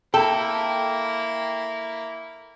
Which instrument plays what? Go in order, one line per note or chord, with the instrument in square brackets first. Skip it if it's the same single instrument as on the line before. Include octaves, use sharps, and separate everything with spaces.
[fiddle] A#3 E4 [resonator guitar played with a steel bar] A4 [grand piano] G5